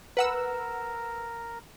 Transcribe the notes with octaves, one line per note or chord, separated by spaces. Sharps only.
A#4 B4 F#5 E6